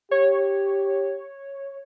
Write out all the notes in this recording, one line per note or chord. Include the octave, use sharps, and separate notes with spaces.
G4 C#5